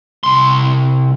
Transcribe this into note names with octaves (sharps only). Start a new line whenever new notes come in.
C2 C6